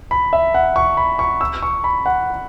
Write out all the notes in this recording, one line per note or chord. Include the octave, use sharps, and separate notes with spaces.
B5
E5
F#5
C#6
B5
C#6
E6
C#6
B5
F#5